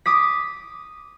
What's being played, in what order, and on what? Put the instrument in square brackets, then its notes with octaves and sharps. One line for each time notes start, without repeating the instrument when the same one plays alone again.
[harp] D6 D#6 B6